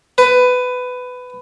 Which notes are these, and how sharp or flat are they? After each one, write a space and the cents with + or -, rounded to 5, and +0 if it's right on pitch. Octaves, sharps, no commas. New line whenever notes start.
B4 +15